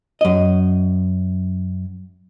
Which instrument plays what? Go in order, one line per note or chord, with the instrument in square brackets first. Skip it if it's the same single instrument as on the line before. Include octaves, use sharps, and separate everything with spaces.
[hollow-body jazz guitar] F#2 D#5